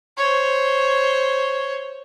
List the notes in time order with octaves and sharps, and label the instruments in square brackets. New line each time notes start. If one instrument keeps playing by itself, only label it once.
[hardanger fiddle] C5 C#5